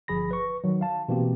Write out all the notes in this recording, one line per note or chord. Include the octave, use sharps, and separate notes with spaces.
G1 F3 G#4 B5 A#6
B4 C#6
D#3 F#3
F5 A5
B2 E3 A#3 C4 G4